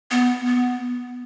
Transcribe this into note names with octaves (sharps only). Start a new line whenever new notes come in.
B3
B3